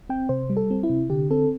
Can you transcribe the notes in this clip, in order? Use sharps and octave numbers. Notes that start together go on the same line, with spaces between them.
C4 G5
C3 C5
G3
A4
C4
E4
C3
D3 G4
C4 A4